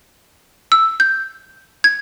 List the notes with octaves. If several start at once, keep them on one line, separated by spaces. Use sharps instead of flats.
E6
G6
G#6